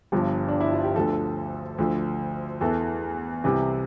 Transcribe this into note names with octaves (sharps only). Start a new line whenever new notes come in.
G1 G2 F3
D4
E4
F4
G4
D2 D3 F3 A4
D2 D3 F3
E2 E3 A4
C2 C3 E3